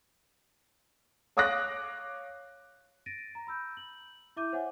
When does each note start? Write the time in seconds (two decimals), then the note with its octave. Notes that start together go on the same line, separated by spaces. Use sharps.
1.37 C#5 F5 D6 D#6 F#6 A#6
3.06 A6 A#6 D7 D#7
3.35 A#5
3.47 B5 E6 G6
3.77 F#7
4.36 E4 E5 D6 G6 D#7
4.53 C5 C#5 E5 F#5 G#5